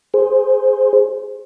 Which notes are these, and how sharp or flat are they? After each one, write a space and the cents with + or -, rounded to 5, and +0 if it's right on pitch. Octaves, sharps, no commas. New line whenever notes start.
G#4 +0 C5 +0